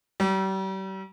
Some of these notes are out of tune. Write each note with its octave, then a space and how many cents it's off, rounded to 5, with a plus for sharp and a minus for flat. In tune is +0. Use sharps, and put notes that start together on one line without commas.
G3 -40